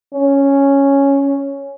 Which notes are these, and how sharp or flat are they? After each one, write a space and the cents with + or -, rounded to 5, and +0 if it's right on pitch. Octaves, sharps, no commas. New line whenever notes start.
C#4 +0